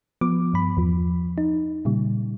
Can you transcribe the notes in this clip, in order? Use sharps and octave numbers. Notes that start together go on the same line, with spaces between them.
F3 B3 D6
G2 B5
E2 F3
D#4
A#2 C#3 G3